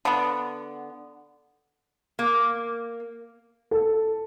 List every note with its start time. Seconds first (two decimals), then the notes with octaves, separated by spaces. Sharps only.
0.05 D3 B3
2.19 A#3
3.71 A4